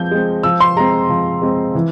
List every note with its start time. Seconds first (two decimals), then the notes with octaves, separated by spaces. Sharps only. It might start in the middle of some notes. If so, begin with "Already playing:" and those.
Already playing: F3 G#3 C4 G6
0.11 G#3 C4
0.43 F3 E6
0.60 C6
0.77 G#3 C4 A#5
1.09 F3
1.42 G#3 C4
1.75 E3